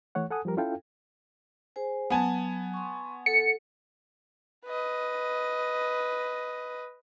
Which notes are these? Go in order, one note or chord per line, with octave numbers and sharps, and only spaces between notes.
E3 A3 C#5 F#5
A4 F#5 G#5 D#6
F3 G3 G4 A#4
C#4 E4 F4 A4 F5 G5
G#4 C5 G#5
F#3 B3 G#5 A5
C6 C#6
A4 F#5 C#7
B4 D#5